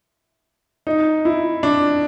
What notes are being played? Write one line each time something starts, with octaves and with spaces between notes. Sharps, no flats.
D#4
E4
D4